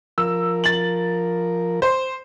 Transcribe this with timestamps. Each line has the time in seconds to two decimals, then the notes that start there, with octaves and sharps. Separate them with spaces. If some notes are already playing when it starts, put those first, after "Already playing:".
0.18 F3 A#4 E6
0.64 A6 F#7
1.82 C5